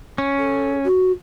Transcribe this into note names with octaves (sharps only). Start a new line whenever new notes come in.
C#4
A4
F#4